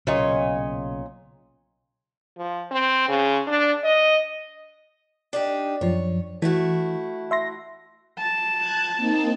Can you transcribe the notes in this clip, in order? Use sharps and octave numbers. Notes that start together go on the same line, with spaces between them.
B1 A#2 C#3 C#5 D#5
F3
C4
C#3
D4
D#5
D4 D#4 G4
F#2 F3 C#5
E3 A3 E4 F#4
E5 C6 A#6
A5
F#6 G#6
A#3 C4 D#4